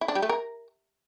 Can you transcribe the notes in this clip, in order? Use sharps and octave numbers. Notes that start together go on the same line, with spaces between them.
E4
D4
G3
A3
A#4